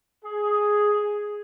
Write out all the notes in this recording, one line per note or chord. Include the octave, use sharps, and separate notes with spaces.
G#4